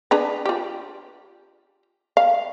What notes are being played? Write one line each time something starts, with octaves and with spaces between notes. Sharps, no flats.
D4 G#4 B4
F4 G4
F5